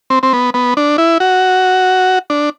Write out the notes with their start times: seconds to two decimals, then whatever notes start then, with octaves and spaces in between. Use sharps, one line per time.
0.10 C4
0.23 C4
0.33 B3
0.54 B3
0.77 D4
0.98 E4
1.20 F#4
2.30 D4